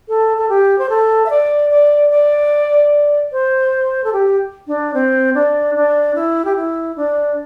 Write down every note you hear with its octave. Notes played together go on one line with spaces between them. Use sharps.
A4
A4
G4
C5
A4
E5
D5
D5
D5
C5
A4
G4
D4
C4
D4
D4
E4
G4
E4
D4